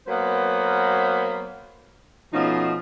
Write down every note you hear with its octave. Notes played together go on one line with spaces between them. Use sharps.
F#3 A#3 B3 B4 C5
B2 F3 A3 C#4 D#4